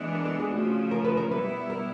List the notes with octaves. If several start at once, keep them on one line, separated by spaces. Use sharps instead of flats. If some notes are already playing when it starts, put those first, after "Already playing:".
Already playing: E3 G#3 B3 D4
A#4
A4
G#4
C#3 F3 A3 F#4
A#4
B4
A#4
B2 G3 B3 E4 B4
A#4